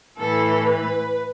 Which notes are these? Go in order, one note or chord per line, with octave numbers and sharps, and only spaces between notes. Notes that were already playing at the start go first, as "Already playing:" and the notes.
A2 E3 A4
B4